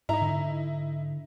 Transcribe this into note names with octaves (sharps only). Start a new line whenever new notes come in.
G#2 D#4 E4 A#5
D3